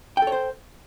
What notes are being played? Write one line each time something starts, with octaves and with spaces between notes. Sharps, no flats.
A4 C5 C#5 G5